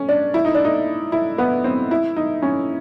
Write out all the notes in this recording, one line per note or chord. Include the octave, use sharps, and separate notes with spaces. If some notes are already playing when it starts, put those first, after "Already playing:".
Already playing: C#4
D4
E4
D#4
D4
D#4
E4
B3
C4
E4
D#4
C#4